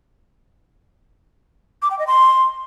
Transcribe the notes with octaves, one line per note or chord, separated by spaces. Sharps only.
D6
G5
D#5
C6